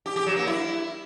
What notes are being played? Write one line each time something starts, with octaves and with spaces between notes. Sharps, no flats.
G4
G4
F#3
A#3
E4